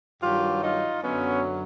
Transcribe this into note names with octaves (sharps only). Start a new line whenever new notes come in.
G2 D#3 F#3 F4 G4
D#4 F4
F#2 D3 F#3 B3 C#4